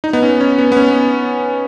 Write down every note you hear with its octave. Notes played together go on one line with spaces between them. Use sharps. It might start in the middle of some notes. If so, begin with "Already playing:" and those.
D#4
B3
C#4
C#4
B3
B3
C#4